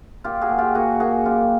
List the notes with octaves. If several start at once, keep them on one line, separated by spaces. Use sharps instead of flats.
A#2 F4 G4
F#4 G#4
A#2
F4 G4
A#3 F#4 G#4
A#3 F#4 G#4
F#2 F4 G4